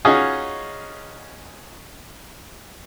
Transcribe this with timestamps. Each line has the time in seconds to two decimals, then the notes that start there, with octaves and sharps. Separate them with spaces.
0.05 C#4 D#4 F4 F#4 G#4 D#5